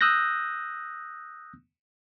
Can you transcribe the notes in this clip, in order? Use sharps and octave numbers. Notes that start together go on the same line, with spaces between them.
D#6 E6 F#6 G6 A#6